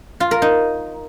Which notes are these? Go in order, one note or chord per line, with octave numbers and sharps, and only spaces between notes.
F4
A#4
D#4